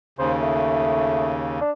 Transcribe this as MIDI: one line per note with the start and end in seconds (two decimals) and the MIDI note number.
0.19 1.60 39
0.19 1.60 49
0.19 0.32 72
0.41 1.31 57
1.61 1.71 62